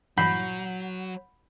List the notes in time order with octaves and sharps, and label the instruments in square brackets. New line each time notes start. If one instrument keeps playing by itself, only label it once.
[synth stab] G2 A#2 E3 [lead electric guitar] F#3 [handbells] F#5 G6 C7 [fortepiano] B5